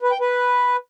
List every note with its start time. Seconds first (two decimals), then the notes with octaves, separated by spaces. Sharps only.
0.02 B4
0.11 G5
0.21 B4